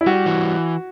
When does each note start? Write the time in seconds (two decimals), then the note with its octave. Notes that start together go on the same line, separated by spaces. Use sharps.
0.01 E4
0.06 G3 F#4
0.26 E3